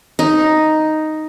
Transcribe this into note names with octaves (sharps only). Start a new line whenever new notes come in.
D#4